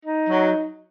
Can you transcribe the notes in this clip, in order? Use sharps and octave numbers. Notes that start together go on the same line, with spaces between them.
D#4
F#3